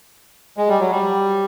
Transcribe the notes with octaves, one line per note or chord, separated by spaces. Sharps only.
G#3
G3
F#3
G3